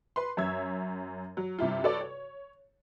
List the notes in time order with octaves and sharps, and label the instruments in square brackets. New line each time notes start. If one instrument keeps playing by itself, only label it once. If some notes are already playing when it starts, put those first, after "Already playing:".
[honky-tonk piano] B4 C6
F#2 C#5 E5 E6 G#6
F#3
G2 C3 E4 F4
F#4 A4 B4 C#5 D5
C#5